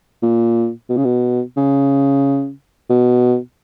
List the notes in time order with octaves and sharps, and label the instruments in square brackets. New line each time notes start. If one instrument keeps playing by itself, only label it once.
[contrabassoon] A#2
B2
C#3
B2
C#3
B2